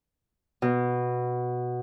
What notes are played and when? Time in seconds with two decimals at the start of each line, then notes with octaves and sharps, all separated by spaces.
0.62 B2